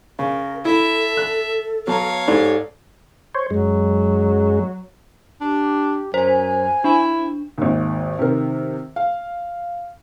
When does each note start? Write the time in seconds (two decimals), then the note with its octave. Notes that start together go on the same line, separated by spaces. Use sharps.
0.19 C#3 A#4
0.65 E4 A4 E5
1.17 F#6
1.87 F#3 B3 C#5 F5 A5 A#5
2.28 G#2 G4 A4 D5
3.35 C5 C#5
3.50 F#2 F#3 G#3
5.41 D4 G4
6.14 F#2 C5 G#5
6.84 D4 E4
7.58 G#1 D#2
8.19 C3 D#3 A#4
8.96 F5